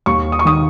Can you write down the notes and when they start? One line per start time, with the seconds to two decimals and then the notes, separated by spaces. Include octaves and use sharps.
0.06 D#2 C#6
0.32 D#6
0.39 C#6
0.45 D#3 D#6